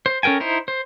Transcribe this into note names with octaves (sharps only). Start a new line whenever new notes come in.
C5
C#4 A4 A#4 G5 G#5
D#4 E4 C5
C5